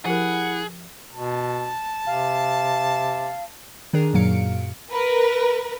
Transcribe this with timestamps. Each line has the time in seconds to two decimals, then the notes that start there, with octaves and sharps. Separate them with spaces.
0.05 F3 E4 G4 G#4 A#4 F#5
1.13 B2 A5
2.06 C3 F5
3.93 D#3 D4 G#4 A#4
4.13 F#2 A#2 F#3 F5 C#7 D7
4.90 A#4 B4